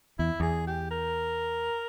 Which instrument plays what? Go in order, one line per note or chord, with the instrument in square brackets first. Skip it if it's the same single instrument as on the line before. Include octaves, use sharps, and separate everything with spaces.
[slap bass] E2 [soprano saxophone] E4
[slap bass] E2 [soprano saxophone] G#4
[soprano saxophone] G4
A#4